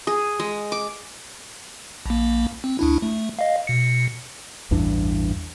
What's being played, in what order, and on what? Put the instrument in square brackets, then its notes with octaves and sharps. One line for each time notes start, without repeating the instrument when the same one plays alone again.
[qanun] G#4
G#3
D6
[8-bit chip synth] A#1 A#3
C4
D2 D4 E4
A3
D#5 F5
B2 C#7
[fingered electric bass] A1 E2 G2 D4